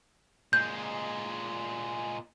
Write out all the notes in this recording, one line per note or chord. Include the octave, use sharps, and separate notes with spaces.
A#2 G#3 G6